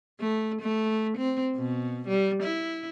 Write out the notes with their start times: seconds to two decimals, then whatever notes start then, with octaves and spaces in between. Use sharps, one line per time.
0.20 A3
0.62 A3
1.18 C4
1.56 B2
2.08 G3
2.43 E4